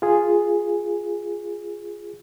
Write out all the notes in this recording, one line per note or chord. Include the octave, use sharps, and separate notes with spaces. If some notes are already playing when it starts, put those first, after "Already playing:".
F4 G#4